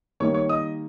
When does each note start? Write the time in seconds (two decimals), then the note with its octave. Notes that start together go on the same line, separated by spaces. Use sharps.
0.20 D#3 G3 A#3 D#4 C#5 C#6
0.34 C#5 C#6
0.49 D#5 D#6